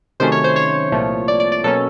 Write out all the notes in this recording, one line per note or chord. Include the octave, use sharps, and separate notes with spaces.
C3 D#3 F#3 A3 C#4 C5
C#5
C5
C#5
C2 A#2 F3 A3
D5
D5
D5
B2 F#3 A#3 C#4 A4